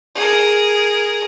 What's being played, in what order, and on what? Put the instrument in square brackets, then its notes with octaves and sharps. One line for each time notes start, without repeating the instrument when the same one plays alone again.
[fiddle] G#4 A#4